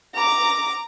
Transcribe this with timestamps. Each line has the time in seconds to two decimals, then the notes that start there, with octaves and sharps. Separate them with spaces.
0.14 A#5 D6